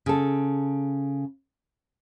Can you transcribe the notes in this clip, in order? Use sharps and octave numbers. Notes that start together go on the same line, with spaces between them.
C#3 A4